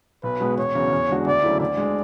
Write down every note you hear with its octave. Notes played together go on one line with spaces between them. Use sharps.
B1 B4
B2 G#3 B3
E1 C#5
E2 C#3 F#3 C#4
E2
D3 G#3 D4 F#4
D2 D5
C#3 F#3 A3 E4
D2 D5
D3 G#3